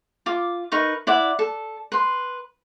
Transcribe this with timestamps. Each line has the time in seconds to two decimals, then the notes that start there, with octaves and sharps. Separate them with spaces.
0.26 F4 D6
0.72 D#4 A#4 B4 C#6
1.07 E4 D5 F#5
1.39 A4
1.92 B4 C6